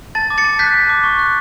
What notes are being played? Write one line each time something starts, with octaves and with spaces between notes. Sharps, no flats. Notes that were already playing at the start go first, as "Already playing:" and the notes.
A5 A6
D6
A6 C#7
A5
F#6 G6 B6
A5
D6
C#6
F#6